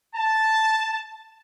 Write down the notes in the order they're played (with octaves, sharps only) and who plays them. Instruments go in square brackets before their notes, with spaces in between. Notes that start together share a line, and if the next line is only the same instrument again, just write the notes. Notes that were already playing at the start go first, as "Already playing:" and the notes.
[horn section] A5